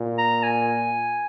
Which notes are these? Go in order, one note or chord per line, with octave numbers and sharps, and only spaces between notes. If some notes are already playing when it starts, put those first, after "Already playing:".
Already playing: A#2
A#5
G#5